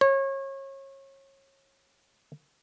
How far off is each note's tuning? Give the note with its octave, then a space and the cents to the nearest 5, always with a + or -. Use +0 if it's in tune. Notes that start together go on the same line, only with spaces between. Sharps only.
C#5 -30